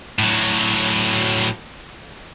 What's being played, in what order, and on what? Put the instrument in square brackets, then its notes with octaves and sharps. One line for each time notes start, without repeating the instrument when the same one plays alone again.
[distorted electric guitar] A2 F#3